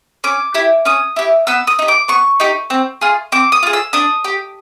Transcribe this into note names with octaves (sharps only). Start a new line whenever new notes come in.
C#4 D6
E4 G4
C#4 D#6
E4 G4
B3 E6
D#6
D#4 G4
D6
B3 C#6
D#4 G4
C4
F4 G#4
C4 D6
D#6
F4 G#4
E6
D4 D#6
G4